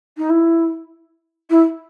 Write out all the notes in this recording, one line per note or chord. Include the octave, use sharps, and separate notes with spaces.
D#4
E4
E4